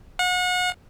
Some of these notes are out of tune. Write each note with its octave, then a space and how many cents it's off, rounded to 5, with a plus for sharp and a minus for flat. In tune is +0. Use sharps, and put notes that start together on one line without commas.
F#5 -35